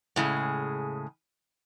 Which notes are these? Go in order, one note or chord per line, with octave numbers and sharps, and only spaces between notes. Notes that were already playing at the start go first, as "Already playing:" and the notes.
A2 C#3 G#3